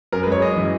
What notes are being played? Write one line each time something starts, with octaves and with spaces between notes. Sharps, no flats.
F#2 A#4
B4
G#3 C#5
F#2 D#5
E3